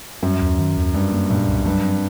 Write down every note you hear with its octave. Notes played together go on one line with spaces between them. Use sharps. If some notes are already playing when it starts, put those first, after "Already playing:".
F#2 G3
D#2
D#3
D#2
G2 G3
A#3
G2 A#2
C2
G2 F#3
C4